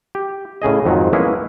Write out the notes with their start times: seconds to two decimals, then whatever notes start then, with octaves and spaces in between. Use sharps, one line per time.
0.15 G4
0.62 A2 C#3 G#4 D#5
0.85 F2 G#2 D#3 F#3
1.13 G#3 A#3 B3 C#4 E4 G#4